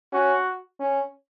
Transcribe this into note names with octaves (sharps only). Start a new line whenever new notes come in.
C#4 F#4
C#4